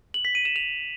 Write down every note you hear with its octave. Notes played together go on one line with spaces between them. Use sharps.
F#7
B6
D#7
E7
F7